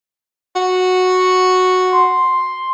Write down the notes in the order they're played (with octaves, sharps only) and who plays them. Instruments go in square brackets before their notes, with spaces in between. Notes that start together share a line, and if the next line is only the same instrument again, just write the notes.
[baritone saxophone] F#4
[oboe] C6